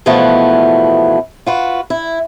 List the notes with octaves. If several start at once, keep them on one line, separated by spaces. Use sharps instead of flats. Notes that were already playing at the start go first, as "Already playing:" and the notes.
B2 E3 F3 G#3 A3 B3
F4 F#4 B4
E4